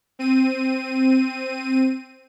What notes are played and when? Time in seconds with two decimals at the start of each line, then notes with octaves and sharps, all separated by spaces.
0.19 C4 D#7